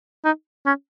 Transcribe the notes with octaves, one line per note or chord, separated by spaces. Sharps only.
D#4
C#4